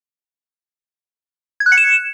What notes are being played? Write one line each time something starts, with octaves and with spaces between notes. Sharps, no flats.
G#6
F#6
C#7
E7